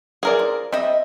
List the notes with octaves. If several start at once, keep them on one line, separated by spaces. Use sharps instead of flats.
E3 A#3 G#4 A#4 D5
F3
G3 C4 D#5 E5